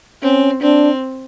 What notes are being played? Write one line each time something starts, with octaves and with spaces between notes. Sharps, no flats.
C4 C#4
C4 D4